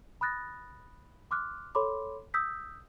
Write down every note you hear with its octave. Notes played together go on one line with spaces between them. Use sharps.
B5 D#6 F#6 A6 A#6
C6 D6 F6 F#6
A4 C#5 B5 C6 D6
D#6 E6 G6 B6